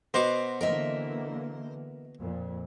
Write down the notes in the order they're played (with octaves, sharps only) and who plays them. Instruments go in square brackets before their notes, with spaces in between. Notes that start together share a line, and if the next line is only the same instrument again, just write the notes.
[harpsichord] B2 F#4 D6 [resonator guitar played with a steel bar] C5 [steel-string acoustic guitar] D#5
[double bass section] D3 E3 A#3 [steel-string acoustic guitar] A#4 D#5 E5
[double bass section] F2 A#2